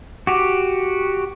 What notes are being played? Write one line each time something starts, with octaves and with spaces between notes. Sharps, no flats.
F#4 G4